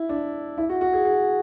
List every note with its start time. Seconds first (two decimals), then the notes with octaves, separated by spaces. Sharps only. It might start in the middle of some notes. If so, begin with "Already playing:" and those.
Already playing: E4
0.09 D4
0.58 E4
0.69 F#4
0.81 F#4
0.93 G#4
1.05 G#4